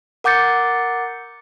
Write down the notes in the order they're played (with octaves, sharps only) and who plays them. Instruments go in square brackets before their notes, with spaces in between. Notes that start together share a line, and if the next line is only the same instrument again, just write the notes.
[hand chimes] A#4 F#5 D6 G6 A6 C#7